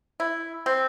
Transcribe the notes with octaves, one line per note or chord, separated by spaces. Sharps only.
E4
C4